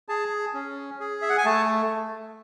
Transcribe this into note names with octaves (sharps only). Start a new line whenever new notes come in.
G#4 A5
C#4
G#4
E5
F#5
G#5
A3 A5